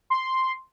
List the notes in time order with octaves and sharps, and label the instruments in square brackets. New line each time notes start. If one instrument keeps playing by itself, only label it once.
[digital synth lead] C6